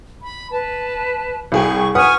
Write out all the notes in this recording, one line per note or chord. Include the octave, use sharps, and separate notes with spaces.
B5
B4 A5
C2 G#4 G5 C#6
B4 F#5 G#5 C#6 D#6 F6